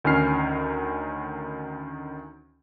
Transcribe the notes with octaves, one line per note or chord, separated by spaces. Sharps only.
D2 D#3 C#4 G#5 F6 C7